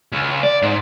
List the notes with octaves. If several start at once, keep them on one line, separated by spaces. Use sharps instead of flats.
C#2
D5
G#2